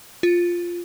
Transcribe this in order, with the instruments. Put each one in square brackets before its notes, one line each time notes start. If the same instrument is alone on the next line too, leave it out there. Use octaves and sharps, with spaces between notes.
[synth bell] F4